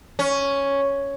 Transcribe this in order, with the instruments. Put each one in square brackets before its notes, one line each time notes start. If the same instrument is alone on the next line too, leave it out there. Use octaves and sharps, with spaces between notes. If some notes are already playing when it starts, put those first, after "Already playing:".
[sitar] C#4